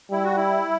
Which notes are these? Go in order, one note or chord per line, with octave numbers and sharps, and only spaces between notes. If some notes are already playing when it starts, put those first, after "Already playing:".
G3 E4
F#4
E4